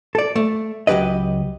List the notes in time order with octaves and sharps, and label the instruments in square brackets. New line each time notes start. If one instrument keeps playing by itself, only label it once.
[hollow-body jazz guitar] A4 D5
A3
C#2 F#3 G4 B4 D#5